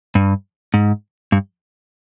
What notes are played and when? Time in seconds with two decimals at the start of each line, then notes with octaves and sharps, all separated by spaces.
0.15 G2
0.74 G#2
1.32 G2